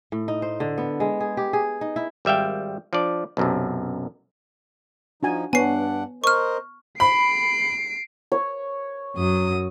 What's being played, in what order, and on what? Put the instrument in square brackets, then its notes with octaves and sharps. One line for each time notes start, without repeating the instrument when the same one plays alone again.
[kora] A2
D#4
C5
D3
B3
G#3
G#4
G4
G#4
D#4
E4
[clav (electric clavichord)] G#1 G3 E5 F5 G5
F3 D4 D5
B1 F#2 C3
[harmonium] F3 D#4 [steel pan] D4 F#4 G#5
[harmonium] G2 D4 F#5 [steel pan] B3 C#5 [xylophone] G#5 C7
[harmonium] A#4 C5 D#5 [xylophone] C#6 F6
[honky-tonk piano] B5 [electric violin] C7 D7
[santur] C#5
[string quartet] F#2 F#3 D#6